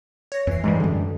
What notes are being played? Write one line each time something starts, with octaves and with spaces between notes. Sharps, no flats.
C#5 A#6
F2 E3 C7
G#2 E3 G3 G#3
F#2 D3